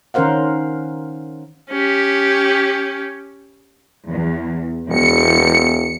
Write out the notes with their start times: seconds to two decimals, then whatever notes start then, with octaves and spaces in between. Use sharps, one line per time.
0.14 D#3 C#4 A#4 C5 F5 F#5
1.70 C#4 G4
4.08 E2
4.90 E1 E2 C#7